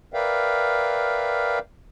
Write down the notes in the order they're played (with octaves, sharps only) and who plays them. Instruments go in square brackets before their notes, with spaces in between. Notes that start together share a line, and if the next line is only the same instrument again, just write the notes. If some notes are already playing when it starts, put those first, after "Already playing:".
[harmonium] A#4 B4 D5 E5 F5 G5